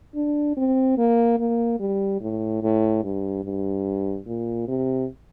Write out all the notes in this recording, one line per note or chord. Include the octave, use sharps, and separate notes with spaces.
D4
C4
A#3
A#3
G3
A2
A2
G2
G2
A#2
C3